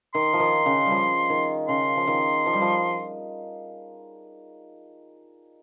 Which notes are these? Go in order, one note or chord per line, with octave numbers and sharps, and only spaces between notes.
D#3 C6
F3
D#3
C#3
G3
F3
D#3
C#3 C6
F3
D#3
F3
G3
F3